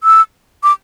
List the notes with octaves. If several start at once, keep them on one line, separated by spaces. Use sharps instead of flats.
E6
D6